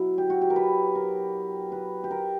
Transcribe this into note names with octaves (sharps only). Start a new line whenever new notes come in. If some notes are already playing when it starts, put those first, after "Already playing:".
Already playing: B2 F#3 E4
G4
F#4
G4
A#4
B4
A#4
B4
G4
A#4